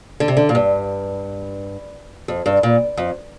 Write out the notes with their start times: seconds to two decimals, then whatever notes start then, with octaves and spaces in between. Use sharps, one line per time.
0.20 D3
0.28 C3
0.37 D3
0.49 A#2
0.55 G2
2.28 F2
2.46 G2
2.63 A#2
2.97 F2